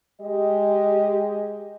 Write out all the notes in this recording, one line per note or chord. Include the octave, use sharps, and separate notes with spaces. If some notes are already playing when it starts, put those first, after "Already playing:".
G#3 G4 D#5